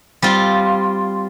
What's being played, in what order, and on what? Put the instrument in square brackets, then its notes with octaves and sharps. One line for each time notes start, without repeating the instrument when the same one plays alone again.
[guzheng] G3 C4 F4